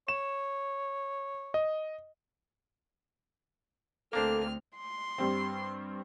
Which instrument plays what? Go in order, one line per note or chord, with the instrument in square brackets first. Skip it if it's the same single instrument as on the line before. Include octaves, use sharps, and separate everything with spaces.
[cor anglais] C#5 [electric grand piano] E7
[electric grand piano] D#5
[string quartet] D2 C4 F6 [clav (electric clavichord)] A#3 D4 C5 [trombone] A4
[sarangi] C6
[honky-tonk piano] G2 G3 C4